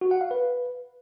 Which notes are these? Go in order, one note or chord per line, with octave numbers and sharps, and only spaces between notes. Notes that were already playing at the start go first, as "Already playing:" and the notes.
F#4
F#5
F5
B4